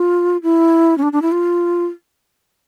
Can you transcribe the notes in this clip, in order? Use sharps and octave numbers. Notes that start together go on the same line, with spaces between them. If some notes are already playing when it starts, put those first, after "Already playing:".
Already playing: F4
E4
C#4
D4
D4
E4
F4